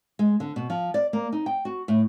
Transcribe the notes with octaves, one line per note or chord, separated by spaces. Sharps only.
G#3
D3
B2
F3
D5
A#3
D#4
G5
F#4
A2